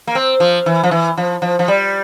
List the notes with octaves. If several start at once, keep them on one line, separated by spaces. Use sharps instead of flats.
A#3
C4
F3
E3
F3
E3
F3
F3
F3
G3